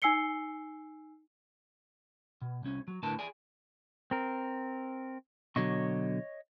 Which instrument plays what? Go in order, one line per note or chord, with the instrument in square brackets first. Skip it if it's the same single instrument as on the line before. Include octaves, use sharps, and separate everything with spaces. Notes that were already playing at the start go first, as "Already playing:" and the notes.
[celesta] D#4 G#5 E6 C7 C#7 G7
[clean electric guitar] B2
C2 C#4
F#3
A2 D3 A#4 B4 A5
G#4 D5 G#5
[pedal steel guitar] C4 A#4
[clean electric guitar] B2 D3 F#3 [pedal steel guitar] C#5 D#5 C#6